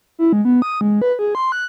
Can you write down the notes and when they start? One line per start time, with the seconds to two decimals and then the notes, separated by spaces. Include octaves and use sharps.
0.19 E4
0.33 G#3
0.45 B3
0.62 D#6
0.81 G#3
1.02 B4
1.19 G#4
1.35 C6
1.52 F#6